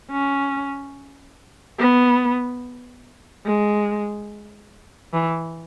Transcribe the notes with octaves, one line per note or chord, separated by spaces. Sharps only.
C#4
B3
G#3
E3